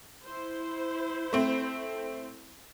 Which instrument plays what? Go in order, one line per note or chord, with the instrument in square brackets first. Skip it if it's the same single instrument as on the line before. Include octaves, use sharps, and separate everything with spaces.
[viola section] E4 C5
[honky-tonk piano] A3 C4